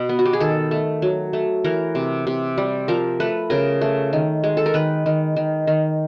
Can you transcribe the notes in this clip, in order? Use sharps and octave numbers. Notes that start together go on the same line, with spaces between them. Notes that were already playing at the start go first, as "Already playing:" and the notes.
Already playing: B2
B3
F#4
G4
G#4
D#3 A4
A3
F#3
A3
E3 A#4
C3
C3
G3
F3 A#4
A3 B4
C#3 A#4
A3
D#3
G#3
A4
A#4
D#3 B4
D#3
D#3
D#3